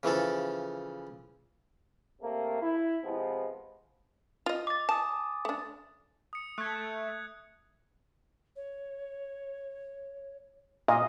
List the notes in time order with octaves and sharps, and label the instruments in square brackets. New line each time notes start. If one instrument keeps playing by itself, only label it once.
[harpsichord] C#3 E3 F3 A4
[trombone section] C3 A3 A#3
E4
C3 F3 G#3 B3
[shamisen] F4 D#5
[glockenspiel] D6 A6
[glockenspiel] G#5 D#6 [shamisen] A5
[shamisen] A3 D4
[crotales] D#6 C#7
[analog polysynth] A3 [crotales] F#6 G#6
[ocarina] C#5
[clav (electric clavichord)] A#2 [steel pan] D#5 F5